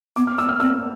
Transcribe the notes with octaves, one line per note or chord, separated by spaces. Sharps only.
B3 D6
F6
B3 E6
F6
C4 E6